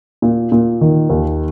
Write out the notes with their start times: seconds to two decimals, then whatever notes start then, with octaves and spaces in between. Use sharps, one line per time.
0.22 A#2
0.52 A#2
0.81 D#3
1.09 D#2